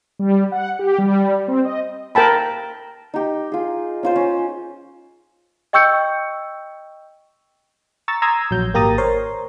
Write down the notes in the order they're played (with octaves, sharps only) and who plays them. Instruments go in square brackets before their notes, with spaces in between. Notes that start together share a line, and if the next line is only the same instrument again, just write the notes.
[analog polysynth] G3
F#5
G4
G3
C4
D#5
[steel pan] A#4 G5 A5 B5
[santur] D#4 G4
F4 G#4
C#4 F4 C5
C#4
[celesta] D#5 G5 C#6 E6 G6 C#7
[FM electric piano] A#5 C#6 E6 A6
A#5 C6 D#6 E6 G#6
A#1 F#3 G6
G#1 A#3 G4 A#5 D#6 A6
A#4 C5 C#5 C6